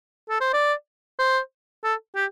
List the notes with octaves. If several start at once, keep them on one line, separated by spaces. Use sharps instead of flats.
A4
C5
D5
C5
A4
G4